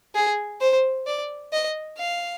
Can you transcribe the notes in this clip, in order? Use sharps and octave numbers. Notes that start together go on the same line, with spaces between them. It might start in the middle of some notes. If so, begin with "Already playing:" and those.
G#4
C5
D5
D#5
F5